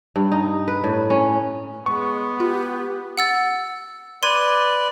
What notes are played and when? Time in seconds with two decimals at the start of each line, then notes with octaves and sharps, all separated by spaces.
0.16 G2
0.32 D#4
0.68 B4
0.84 A2
1.10 C#4
1.86 G#3 B3 C#6
2.40 F4 G4
3.17 F#5 E6 A6
4.23 B4 D5 C6 G#6 D#7